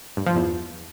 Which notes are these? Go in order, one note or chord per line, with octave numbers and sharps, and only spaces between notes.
G2
F3
E2